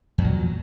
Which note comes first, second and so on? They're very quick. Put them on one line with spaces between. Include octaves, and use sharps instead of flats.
E2 A#2 F#3